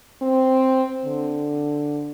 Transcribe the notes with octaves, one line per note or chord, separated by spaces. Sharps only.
C4
D3